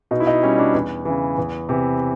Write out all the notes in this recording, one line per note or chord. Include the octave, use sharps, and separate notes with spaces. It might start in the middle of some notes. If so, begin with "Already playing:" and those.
B2 D#4
E4
D#4
G3 C#4
D4
E2
C#3 E3
E2
C3 E3